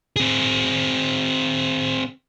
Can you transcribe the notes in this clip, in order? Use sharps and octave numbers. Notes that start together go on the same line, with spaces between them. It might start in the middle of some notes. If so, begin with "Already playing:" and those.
C4 G#4